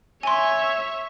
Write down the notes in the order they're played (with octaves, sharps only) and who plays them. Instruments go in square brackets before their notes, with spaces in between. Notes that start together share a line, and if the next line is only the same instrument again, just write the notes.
[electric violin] C#5 E5 [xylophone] G#5 C6